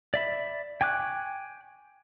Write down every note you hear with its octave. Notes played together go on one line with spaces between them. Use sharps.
D5 E5 B5
G5 G#5 C#6 D6 F#6